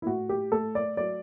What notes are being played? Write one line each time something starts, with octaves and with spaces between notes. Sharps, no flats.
E4
A2 F#4
G4
A3 A4
D5
F#3 D5